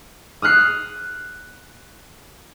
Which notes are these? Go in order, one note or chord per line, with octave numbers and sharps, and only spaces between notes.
D#6 F6 F#6 C7